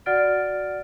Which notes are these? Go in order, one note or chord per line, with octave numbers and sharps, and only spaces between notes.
F#4 D5 F#5 F6 A6 D7